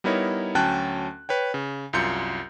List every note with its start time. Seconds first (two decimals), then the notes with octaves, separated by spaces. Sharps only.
0.04 G3 B3 D#4 E4 A#4 C#5
0.55 D2 F#3 C#4 G5 A5 F#6
1.29 B4 C#5 G5
1.54 C#3
1.93 C2 F#2 F4 G6 C#7